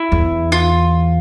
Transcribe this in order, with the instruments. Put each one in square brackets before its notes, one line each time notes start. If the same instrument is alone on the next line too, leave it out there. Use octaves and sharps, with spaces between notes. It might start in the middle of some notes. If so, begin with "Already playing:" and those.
Already playing: [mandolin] E4
[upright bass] E2
[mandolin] F4